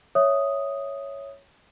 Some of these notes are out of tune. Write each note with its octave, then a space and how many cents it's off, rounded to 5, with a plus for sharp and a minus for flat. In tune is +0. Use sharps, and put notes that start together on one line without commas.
C#5 +0 E5 +0 D#6 +0